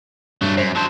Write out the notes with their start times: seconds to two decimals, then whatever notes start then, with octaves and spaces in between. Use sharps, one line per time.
0.41 G2 F#3 A3
0.57 F#2 C5
0.75 F#3 C5 A5